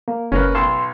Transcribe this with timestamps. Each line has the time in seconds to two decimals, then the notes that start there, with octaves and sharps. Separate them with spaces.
0.08 A#3
0.32 F#1 C#4 A#4 B4
0.55 B1 A5 C6 E6